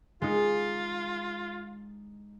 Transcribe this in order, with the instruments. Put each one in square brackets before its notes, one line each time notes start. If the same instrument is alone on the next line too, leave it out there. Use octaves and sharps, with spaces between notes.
[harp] G#3 D#4 [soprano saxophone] F4